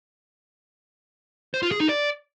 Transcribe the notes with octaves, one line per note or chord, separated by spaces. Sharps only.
C5
F4
G#4
D#4
D5